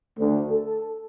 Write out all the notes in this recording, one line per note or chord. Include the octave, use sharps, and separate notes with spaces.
D2
A4